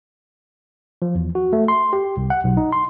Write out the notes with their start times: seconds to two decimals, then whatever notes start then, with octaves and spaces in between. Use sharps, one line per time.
1.02 F3
1.15 E2
1.35 F#4
1.53 A3
1.68 C6
1.93 G4
2.17 C2
2.30 F#5
2.44 B1
2.57 D#4
2.72 C6